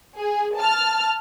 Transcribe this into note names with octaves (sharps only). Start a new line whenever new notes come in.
G#4
A5 F6